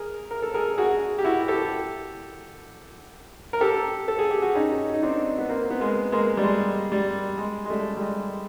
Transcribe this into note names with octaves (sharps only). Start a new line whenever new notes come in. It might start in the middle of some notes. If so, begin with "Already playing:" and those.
Already playing: G#4 A#4
A#4
A4
G#4 A#4
F#4 G#4
G4
E4 F#4
G4 A4
A#4
G4 A4
A4
G#4
G4
F#4 G#4
C#4 D#4
D#4
C4 D4
B3
A#3 C4
B3
G#3 A#3
G#3 A#3
G3
G#3
G3
G#3
G#3
G3 A3
G3
G#3